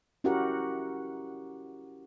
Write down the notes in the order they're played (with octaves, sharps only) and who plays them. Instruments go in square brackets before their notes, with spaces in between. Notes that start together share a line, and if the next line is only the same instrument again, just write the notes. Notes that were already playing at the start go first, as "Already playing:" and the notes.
[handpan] C#4 E4 F#4 G4 A#4 F#5